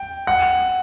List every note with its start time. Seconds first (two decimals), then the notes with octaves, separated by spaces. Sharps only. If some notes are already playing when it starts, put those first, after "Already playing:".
Already playing: G5
0.27 F#5